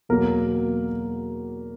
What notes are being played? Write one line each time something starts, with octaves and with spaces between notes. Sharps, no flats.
E2 B2 F#3 A#3 A#4